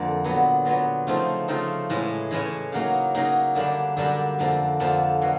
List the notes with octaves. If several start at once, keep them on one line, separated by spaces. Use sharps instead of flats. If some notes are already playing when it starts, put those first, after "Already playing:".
Already playing: F2 D3 A#3
A#2 F#3 B3
A#2 F#3 B3
C#3 F3 A3 C4 D#4
C#3 F3 A3 C4 D#4
A2 E3 G#3 C#4 E4
A2 E3 G#3 C#4 E4
C#3 F#3 A#3 D#4
C#3 F#3 A#3 D#4
F#2 D3 G3 A#3 D4
F#2 D3 G3 A#3 D4
F2 D3 F3 A#3
F2 D3 F3 A#3
B2 F#3